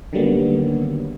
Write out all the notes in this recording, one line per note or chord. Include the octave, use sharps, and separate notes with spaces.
D3 D#3 F#3 G3 A#3 B3